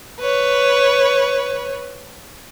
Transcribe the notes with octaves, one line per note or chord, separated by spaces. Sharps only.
B4 C#5